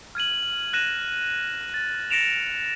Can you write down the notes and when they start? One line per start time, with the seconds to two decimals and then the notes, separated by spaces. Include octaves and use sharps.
0.15 F6 G#6 D#7 F#7
0.73 F#6 A#6 D#7 E7
1.74 A6
2.10 A6 A#6 C#7 D7 E7 F7